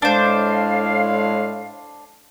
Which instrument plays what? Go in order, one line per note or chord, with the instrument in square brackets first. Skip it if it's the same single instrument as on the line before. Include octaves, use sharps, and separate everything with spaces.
[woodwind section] A2 G#3 F5 [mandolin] D4 C5